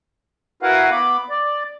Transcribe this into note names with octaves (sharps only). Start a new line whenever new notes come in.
E4 F#4 A#4 B4 F5 F#5
B3 B5 D6
D5